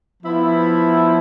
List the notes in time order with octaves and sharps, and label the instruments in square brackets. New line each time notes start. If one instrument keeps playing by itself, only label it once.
[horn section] F3 B3 E4